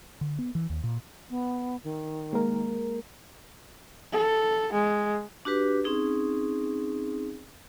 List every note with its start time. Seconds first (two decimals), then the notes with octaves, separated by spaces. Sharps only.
0.21 D3
0.39 B3
0.55 E3
0.70 D#2
0.84 A#2
1.30 B3
1.84 D#3
2.33 G#3 A#3 A#4
4.12 A4
4.73 G#3
5.45 D4 F#4 G4 B4
5.84 C4 C#4 D#4 G#4